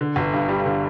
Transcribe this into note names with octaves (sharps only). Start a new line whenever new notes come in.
D3
G1
G2
G3
D3